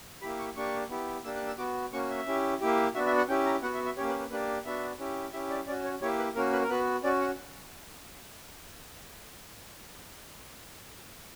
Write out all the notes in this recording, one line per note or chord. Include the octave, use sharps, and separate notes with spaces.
A#3 E4 G4 B5
C#6
A#3 D4 G4 C#6
B3 E4 G4
A#3 D4 G4 E6
F#6
E6
B3 F#4 D6
A#3 C#4 F#4 C#6
E5
C#4 E4 G4
A#3 E4 G4
B3 D4 F#4 E5
E5
F#5
C#4 E4 G4 G5
A#5
B3 F#4 F#5
E5
E5
A#3 C#4 G4 C#5
B4
B4
A#3 D4 G4 B4
B3 D4 F#4 E5
C#4 E4 G4
C#4 E4 G4 E5
D5
C#4 F#4 D5
C#5
A#3 E4 G4 C#5
B4
A#3 C#4 F#4 A#4
B4
A#4
B3 F#4 B4
C#4 F#4 D5
F#5